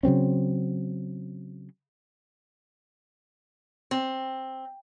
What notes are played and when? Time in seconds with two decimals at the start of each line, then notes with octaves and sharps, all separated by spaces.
0.03 C#3 F#3 C4 C#4
3.91 C4